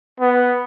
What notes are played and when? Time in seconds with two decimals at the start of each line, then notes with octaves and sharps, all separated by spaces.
0.20 B3